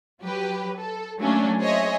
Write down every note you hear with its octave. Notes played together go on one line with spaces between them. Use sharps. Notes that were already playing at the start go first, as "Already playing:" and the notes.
F#3 G4 B4
A4
F#3 A3 A#3 C#4 D4
G#4 C5 C#5 D#5 E5